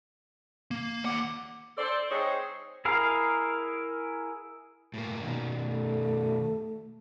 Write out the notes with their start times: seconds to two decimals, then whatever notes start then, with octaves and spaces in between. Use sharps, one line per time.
0.71 A#3
1.05 D#2 F#5 D6
1.77 A4 C5 D5
2.10 G#3 C4 D#4 G#4 C5 C#5
2.85 E4 G#4 A#4 F5
4.94 A2 A#3
5.23 B2 D#3
5.63 A3